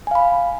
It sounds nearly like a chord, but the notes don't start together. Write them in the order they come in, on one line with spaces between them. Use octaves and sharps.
G#5 F5 B5